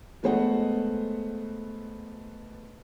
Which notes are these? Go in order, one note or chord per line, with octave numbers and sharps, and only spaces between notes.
G#3 A3 B3 C5 D#5 F#5